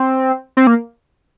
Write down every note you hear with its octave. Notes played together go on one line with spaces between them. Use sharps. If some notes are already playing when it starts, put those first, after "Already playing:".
Already playing: C4
C4
A#3